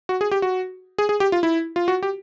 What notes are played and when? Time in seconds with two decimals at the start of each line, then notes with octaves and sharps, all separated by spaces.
0.09 F#4
0.21 G#4
0.31 G4
0.42 F#4
0.98 G#4
1.09 G#4
1.20 G4
1.32 F4
1.43 E4
1.76 F4
1.88 F#4
2.03 G4